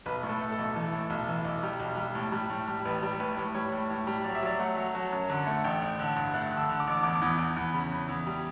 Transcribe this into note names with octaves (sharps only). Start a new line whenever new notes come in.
B1 B4
A2
A4
A3
A4
B1
E3 A4
A2
B1
E3
B1
G3
B1
G3
A2
G3
A2
G3
A1 B4
G3
A2 B4
A2
G3 C#5
A2
A2
G3
F#3 D5
E5
F#3 D5
A3 F#5
F#3
F#3 A5
F#2
D3
A3
A1 G5
A1
D3
G2
A3 F#6
D3
E6
D3
D6
A1
E2 D6
E2
E2
E2
C#3 B5
E2
E2
G3